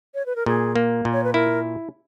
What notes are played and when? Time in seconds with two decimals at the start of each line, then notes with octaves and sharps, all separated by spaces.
0.14 C#5
0.26 B4
0.36 A#4
0.46 A#2 G#4
0.76 A#3
1.05 A#2
1.13 C#5
1.24 B4
1.33 E4 A#4